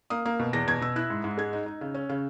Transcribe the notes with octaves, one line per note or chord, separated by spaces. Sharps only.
A#3 D#6
A#3
B2
E2 A#6
B2 G#6
B2 E6
E4 F#6
G#2
G#2
G#3 G#6
D#4
D#4
C#3
C#4
C#3